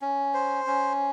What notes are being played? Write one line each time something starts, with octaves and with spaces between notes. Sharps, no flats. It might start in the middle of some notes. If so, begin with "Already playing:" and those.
C#4
C5
C#4